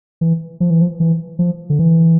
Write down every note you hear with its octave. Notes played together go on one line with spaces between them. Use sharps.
E3
F3
E3
F3
E3
F3
D3
E3